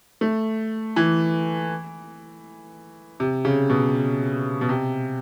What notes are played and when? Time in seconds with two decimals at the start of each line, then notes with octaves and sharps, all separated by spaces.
0.21 A3
0.96 E3
3.20 C3
3.45 C#3
3.70 B2
4.61 B2
4.69 C3